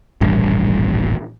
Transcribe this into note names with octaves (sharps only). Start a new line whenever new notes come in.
D#1 A1 G2